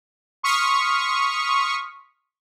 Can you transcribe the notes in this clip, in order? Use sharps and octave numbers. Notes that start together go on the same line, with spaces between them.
C6 C#6 D#6 F6 B6